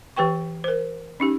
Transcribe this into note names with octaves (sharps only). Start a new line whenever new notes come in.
E3 G4 B4 G5 C#6
A#4 C5
C#4 D#4 G4